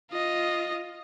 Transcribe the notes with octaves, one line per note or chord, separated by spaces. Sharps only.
F4 D#5